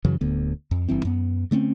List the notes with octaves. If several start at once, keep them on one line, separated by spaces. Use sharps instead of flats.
F#2 C#3 E3 F#3
D1 D2 D3 B3
F2
F#1 G2 E3 C4
F#2 B3
D3 A3 C4 C#4